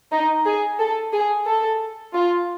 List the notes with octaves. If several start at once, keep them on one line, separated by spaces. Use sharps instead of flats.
D#4
G#4
A4
G#4
A4
F4